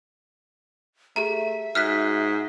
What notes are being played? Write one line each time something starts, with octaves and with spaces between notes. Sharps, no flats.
A3 G4 G#4 E5 A#5
G#2 F#4 F6 F#6 B6